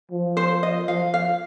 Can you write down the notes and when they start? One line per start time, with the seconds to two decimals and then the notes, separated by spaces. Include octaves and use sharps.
0.11 F3
0.37 C5
0.63 D#5
0.88 F3 F5
1.14 F5